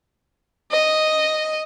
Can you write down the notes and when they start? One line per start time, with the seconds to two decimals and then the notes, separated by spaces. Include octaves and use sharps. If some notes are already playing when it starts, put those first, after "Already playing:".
0.71 D#5